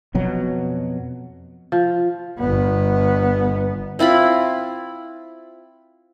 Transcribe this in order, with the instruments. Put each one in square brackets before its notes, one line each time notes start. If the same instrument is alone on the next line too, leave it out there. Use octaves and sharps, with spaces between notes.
[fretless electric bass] F2 B2 F#3
[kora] F3
[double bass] G1 B3
[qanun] C4 E4 F4 B5